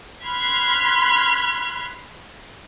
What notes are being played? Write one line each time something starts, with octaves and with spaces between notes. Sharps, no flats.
B5 C6 F6 F#6 G#6 B6